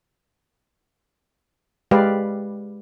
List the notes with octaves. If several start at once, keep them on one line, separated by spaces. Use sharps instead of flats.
G#3 G4 B4 D5 F5